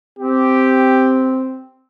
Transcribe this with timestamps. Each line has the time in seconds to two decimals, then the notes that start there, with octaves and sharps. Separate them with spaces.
0.19 C4 G4